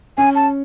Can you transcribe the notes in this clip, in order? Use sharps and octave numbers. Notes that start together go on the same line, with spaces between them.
C#4 G#5
A5